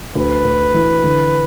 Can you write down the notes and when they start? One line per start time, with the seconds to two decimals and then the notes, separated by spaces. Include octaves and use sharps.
0.15 D2 B4
0.45 D2
0.74 E3
1.04 D3